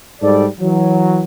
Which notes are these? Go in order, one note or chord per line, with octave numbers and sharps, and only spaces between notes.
G#2 G3 A4 D5
E3 F#3